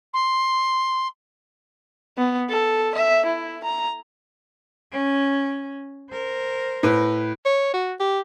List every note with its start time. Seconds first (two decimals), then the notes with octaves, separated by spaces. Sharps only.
0.13 C6
2.18 B3
2.50 A4
2.95 E5
3.26 E4
3.64 A#5
4.92 C#4
6.10 A#4 C5
6.83 A2 B4
7.45 C#5
7.73 F#4
8.00 G4